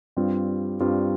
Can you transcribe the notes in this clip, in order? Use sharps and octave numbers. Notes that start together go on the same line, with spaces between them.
G2 G3 C4 F4
G2 G3 C4 F4